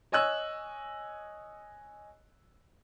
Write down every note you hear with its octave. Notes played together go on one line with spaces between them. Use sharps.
C#5 D#5 G#5 E6 F#6